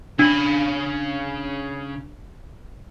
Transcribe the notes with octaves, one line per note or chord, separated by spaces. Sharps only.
C#3 D4 B5